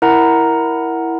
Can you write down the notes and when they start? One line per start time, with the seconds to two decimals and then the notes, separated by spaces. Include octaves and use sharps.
0.02 E4 A#4 F#5 A#5